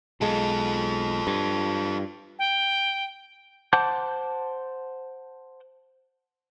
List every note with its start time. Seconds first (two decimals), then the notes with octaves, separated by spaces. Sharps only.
0.21 B1 G#3 F4 A4
1.27 G2
2.39 G5
3.73 C5 F#5 A5 D6 G6